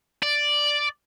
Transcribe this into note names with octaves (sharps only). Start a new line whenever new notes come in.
D5